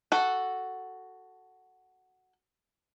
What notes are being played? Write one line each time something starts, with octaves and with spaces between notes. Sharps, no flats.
F#4 A4